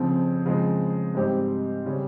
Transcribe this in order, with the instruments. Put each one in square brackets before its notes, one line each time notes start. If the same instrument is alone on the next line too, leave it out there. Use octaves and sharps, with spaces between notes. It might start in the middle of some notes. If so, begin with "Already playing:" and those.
Already playing: [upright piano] F2 C#3 F3 C4
C#3 F3 G#3 C4
G#2 G3 C4 G4 C5
C#3 G3 C#4